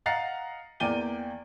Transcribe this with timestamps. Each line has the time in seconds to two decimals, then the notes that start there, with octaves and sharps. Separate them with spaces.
0.06 D#5 F5 F#5 A#5 A6 C7
0.80 E2 A#3 D5 G5 D#7 G7